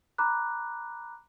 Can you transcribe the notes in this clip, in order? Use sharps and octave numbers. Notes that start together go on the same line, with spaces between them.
A#5 B5 D6 F#6